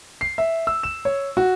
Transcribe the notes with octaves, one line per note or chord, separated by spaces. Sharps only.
C7
E5
E6
E7
C#5
F#4